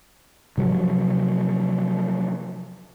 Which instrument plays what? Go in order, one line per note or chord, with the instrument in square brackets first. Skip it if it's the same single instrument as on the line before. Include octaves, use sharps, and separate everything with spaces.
[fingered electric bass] C3 F3 F#3